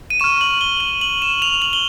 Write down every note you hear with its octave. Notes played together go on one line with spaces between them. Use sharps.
D#7
C#6 F6 E7
F#7
G7
F#7
F#7
E7
F7
F#7
G7